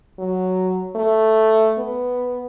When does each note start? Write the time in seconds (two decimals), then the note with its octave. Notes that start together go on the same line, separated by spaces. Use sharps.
0.19 F#3
0.96 A3
1.78 B3